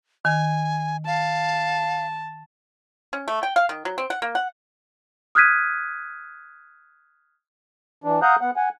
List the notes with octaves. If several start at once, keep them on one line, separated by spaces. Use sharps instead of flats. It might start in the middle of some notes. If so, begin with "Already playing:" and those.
D#3 G#5
F5 A5
C#4
A3
G5
F5
D#3
F#3
C4
F#5
A#3
F#5
D#6 F6 F#6 G#6 B6 D#7
E3 D4
F5 F#5 A#5 D#6 F#6 G6
B3 F#5
F#5 G#5